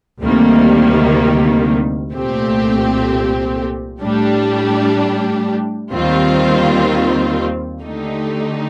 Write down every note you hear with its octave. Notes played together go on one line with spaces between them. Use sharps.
D2 C3 D#3 G3 A#3
C2 A#2 A3 C4 G4
A2 G3 D4 G4
D#2 D#3 G3 C4 F4
D3 A3 D#4 G4